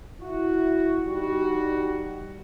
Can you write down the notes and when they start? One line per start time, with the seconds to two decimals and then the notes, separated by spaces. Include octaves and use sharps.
0.20 E4 F#4
1.05 G3 D#4 F#4